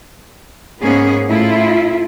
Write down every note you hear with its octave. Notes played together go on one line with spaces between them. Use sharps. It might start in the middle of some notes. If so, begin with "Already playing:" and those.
G#2 A#3 B3 C#4 G#4
A2 E4 F4